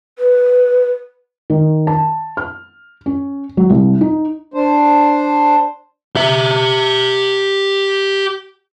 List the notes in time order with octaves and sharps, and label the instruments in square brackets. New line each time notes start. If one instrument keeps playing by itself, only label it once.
[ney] B4
[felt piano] D#3
A5
F6
C#4
F#3
C2
D#4
[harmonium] D4 C5
[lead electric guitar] G4 E5